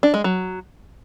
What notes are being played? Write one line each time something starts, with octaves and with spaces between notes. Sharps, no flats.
D4
G#3
F#3